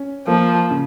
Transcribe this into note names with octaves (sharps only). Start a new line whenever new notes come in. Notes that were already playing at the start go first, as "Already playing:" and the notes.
Already playing: C#4
F3 A#3
C#3